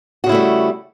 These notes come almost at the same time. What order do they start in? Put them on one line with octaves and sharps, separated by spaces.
F#4 C#3 E4 A3 G3